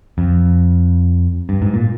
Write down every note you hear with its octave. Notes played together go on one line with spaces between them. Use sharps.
F2
G2
G#2
A#2